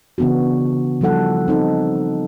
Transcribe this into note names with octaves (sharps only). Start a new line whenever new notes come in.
C#3 E3 B3 D4 F#4
F3 G3 D#4 A4 F#5
C4 D#4 A4